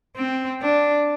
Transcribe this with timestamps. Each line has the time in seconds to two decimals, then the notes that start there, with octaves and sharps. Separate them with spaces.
0.17 C4
0.62 D4